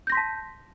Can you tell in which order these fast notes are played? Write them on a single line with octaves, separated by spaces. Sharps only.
G6 A#6 C6 B6 A5